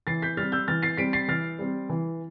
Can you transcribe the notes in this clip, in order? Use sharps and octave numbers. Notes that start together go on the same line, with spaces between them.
E3 A6 C7
G6 B6
G3 C4 F6 A6
E6 G6
E3 F6 A6
A6 C7
G3 C4 B6 D7
A6 C7
E3 F6 A6
G3 C4
E3